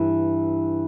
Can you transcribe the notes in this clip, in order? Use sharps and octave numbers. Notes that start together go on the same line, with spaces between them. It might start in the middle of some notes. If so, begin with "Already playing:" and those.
Already playing: G2 E3